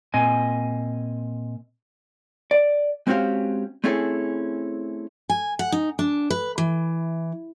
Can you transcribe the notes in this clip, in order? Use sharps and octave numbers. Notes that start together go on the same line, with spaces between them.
A#2 C4 D#5 G#5
D5
G#3 C4 C#4 F#4 G4 F5
A3 C4 C#4 E4 G#4 A4
G#5
F#5
D#4
D4
B4
E3